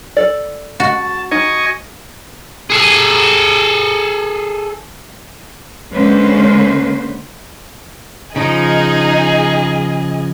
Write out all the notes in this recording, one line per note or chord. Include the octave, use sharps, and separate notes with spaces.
A4 D5
F#4 A5
D#4 D#5 G#5 C#6
G#4 A4
D3 G#3 A#3 C#4 B4 C5
C#3 F3 D#4 G#4 D#5